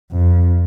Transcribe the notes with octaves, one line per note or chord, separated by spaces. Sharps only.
F2